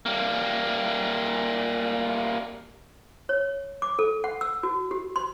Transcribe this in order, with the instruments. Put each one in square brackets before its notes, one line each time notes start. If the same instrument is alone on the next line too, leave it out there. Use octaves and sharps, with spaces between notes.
[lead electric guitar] G3 A#3
[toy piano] C#5
D6
A4
F#5
E6
F#4
G4
C6